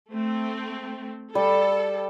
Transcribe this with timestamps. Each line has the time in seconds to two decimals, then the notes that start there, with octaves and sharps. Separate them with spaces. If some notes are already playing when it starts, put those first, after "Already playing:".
0.12 A3 C4
1.35 G3 A4